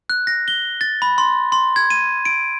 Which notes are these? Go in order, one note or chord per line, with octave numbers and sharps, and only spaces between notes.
F#6
A#6
G7
A6
B5
C6
C6
G#6
D#7
D7